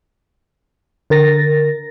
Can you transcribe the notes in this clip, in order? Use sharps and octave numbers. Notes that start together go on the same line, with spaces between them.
D3 A#4 A6 A#6